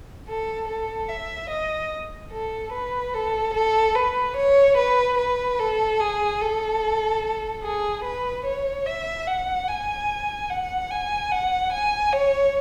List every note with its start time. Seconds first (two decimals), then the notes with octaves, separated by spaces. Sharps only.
0.27 A4
0.68 A4
1.09 E5
1.49 D#5
2.32 A4
2.72 B4
3.14 A4
3.54 A4
3.95 B4
4.36 C#5
4.77 B4
5.18 B4
5.59 A4
6.00 G#4
6.41 A4
7.63 G#4
8.04 B4
8.45 C#5
8.86 E5
9.27 F#5
9.68 G#5
10.50 F#5
10.90 G#5
11.31 F#5
11.72 G#5
12.13 C#5